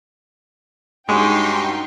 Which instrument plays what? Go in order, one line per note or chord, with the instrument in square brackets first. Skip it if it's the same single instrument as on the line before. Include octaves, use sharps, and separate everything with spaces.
[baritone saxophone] G2 [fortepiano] G#3 [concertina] C#4 F#4 D6 [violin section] D#4 G5 C6